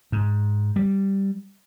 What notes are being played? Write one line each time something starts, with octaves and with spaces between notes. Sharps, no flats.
G#2
G3